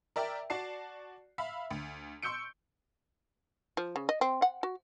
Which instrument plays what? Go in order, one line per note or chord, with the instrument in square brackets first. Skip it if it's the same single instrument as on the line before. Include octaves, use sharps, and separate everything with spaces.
[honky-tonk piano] A#4 D5 E5 G5
F#4 D5 A5 C7
E5 F5 B5
D2
C6 C#6 E6 G6 C#7 D7
[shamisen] F3
C#3
D#5
C4
F#5
F#4